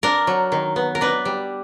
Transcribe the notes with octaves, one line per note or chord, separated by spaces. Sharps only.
D4 A#4
F#3
D#3
B3
A#4
D4 B4
G3